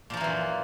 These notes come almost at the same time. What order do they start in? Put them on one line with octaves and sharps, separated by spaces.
A#2 F3 A#3 E3 F#2